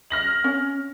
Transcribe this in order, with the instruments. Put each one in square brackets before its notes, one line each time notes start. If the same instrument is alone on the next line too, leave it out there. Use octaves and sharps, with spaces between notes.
[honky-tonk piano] F6 A#6 F#7
[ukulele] C#4